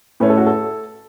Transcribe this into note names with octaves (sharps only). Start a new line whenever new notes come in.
A2 A3 C#4 B4
A4
F#4
A4